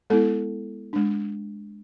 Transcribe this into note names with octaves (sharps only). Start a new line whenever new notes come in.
G#3 B3 E4 A4
G#3 D4